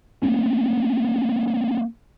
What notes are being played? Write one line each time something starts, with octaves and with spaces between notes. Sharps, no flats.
A3 A#3 C4 C#4